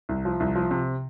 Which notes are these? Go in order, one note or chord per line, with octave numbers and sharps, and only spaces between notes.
C2
F3
C2
F3
C3